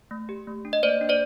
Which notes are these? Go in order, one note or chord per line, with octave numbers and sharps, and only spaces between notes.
A3
G4
A3
D4
D#5
A#3 C5 D5
D4
C5 D5